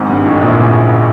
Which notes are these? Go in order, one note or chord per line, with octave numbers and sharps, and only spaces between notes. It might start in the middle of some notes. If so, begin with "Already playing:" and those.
Already playing: G#1 G#2
G2
A1 A2
A#1 A#2
C#3